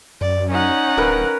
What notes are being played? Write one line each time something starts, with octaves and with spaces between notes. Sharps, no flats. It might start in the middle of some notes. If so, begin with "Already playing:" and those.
F#2 D5
C#4 D#4 F#5
D1 A#4 B4